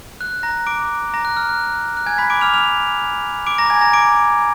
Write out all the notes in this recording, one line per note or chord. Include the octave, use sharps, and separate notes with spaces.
F#6
A#5 A#6
D6 D7
A#5 A#6
F#6
F6
F#6
F#6
G#5 G#6
B5 B6
D6 D7
F6 F7
F6 F7
D6 D7
A#5 A#6
G#5 G#6
A#5 A#6
D6 D7